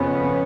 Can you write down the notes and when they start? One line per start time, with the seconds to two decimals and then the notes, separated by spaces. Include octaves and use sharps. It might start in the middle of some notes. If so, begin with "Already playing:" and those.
Already playing: F2 C#3 B3 C#4